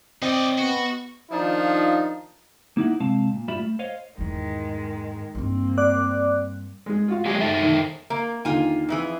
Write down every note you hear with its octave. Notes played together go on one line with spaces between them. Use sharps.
C4 D#4 D5 D#5
B3 F#4
D#3 F3 D4 D#4 F4
A#3 D#4 E4 F#5
C3 G#3 C4 F5 A5
A#2
G2 G3 F4 E5 B5
A3
C5 C#5 D#5 F5
E2 G#2 D#3 G#3
G2 G3 A#3 C4
D5 D6 F#6
G#3 G#4
F4 F#4 F5
F#3 G#3 G4 G#4
D#4 A4 E5
D#3
A#3 A#4
D#2 D3 F4 G#5
F2 E3 G#4